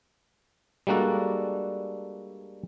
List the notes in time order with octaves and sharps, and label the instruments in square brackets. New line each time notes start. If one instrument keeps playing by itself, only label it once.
[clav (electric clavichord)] G3 G#3 A#3 D4 F#4 A4